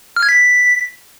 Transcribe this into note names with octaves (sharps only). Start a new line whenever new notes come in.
F6
G#6
B6